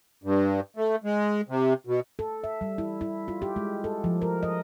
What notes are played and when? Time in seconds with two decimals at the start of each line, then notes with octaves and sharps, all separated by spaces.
0.24 G2
0.76 A3
1.04 G#3
1.48 C3
1.87 B2
2.19 A4
2.44 E5
2.61 G3
2.78 E4
3.01 E4
3.28 F4
3.42 G4
3.56 G#3
3.84 A4
4.04 F3
4.22 A#4
4.43 D#5